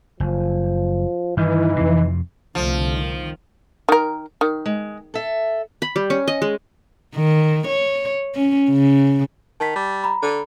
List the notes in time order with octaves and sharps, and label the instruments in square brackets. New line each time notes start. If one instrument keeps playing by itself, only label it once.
[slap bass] F#1 [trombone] F3
[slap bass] G2 D#3 [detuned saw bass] E3 [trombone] D#4
[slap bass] F2 C3
[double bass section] C2 D3 A3 [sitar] F3
[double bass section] D#3
[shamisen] D#3 A#4
D#3
[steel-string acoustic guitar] G#3
A4 E5
[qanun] B5
G3
C#4
D#5
G#3
[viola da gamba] D#3
C#5
C#4
C#3
[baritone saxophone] D#3 [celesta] A5 B6
[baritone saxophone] G3
[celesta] A#5 B5
[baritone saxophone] D3